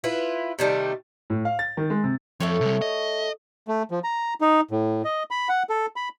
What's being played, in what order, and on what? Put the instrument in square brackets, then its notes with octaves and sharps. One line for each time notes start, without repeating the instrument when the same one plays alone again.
[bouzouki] E4 F4 B4
C3 D#3 G3 A3
[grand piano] A2
F5
A6
D#3
G#3
C3
[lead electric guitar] F2 [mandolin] A3 A4 C#5
[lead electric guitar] C3 G3
D#5
[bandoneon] A3
F3
A#5
D#4
A2
D#5
B5
F#5
A4
B5